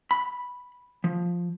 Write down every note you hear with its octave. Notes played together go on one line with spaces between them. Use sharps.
B5
F3